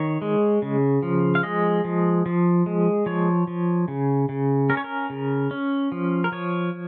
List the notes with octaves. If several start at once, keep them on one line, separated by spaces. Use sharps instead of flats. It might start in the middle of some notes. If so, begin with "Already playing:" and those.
Already playing: D#3 C#5
G#3
C#3
F3
F5
G#3 D#5
F3
F3
G#3
F3 C#5
F3
C#3
C#3
C#4 A#4
C#5
A#4
C#3
C#4
F3
A#4
F3 C#5